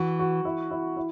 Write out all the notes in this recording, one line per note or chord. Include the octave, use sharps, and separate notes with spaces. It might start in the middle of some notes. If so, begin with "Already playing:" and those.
Already playing: E3 F#4
F#4
E4
E4
E4